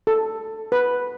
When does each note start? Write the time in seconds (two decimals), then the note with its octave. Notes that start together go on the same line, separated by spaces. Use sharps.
0.07 A4
0.72 B4